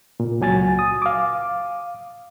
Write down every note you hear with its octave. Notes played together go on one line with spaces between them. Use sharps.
A#2
C#2 F#3 G#5 A6
D#6
F5 D6